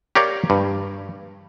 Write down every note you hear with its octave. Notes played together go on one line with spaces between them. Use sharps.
G4 A#4 C#5 D5 F5 G5
G2